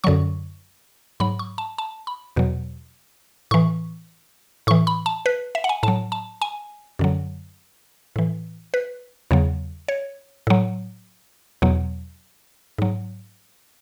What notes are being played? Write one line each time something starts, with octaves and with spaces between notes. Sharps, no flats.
F#2 D3 F#3 C#6
G#2 F#3 B5
C#6
A5
A5
B5
E2 B2 F#3
A2 E3 C#6
A2 E3 C#6
B5
A5
B4
E5
F#5
G#5
A2 F#3 A5
A5
G#5
F#2 D3 F#3
A2 E3
B4
E2 C#3 F#3
C#5
A2 F#3
E2 B2 F#3
G#2 F#3